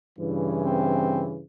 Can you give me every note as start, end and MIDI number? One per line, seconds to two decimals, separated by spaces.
0.19 1.44 43
0.19 1.44 49
0.19 1.44 52
0.64 1.22 60